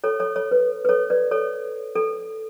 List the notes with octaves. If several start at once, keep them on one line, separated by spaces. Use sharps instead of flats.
A4 C#5
A4 C#5
A4 C#5
B4
B4
A4 C#5
B4 D5
A4 C#5
A4